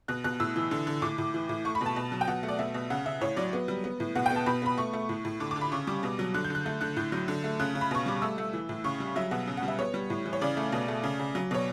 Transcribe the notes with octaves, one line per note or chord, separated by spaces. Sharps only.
B2 F#6
B2 F#6
A2 E6
E3
D3
D3
A2 D6
A2
E3
A2
A3 C#6
B5
B2 A5
B2
F#3
G5
B2 F#5
A3
D5
B2 E5
B2
C#3 F#5
C#3 E5
A2 C#5
F#3 D5
B3
G3
B3
A2
B2 F#5
G5
B3
A5
B2 B5
B3 B5
A3 C#6
A3
A2
A2
D3 D6
D3 D6
B5
C#3 C#6
G3 D6
B2
F#3
D3 F#6
G6
D3 F#6
A3 G6
D3 F#6
A2 G6
F#3
D3
A3
C#3 F#6
C#3
B5
B2 C#6
G3 D6
A3 E6
A3
E3
A2
C#3 C#6
G3
F#3 E5
B2 F#5
C#3
F#5
G3
E5
B3 C#5
G3
A2
E3
C#5
C#3 D5
A3
B2
A3
C#3
C#3
F#3
B2 C#5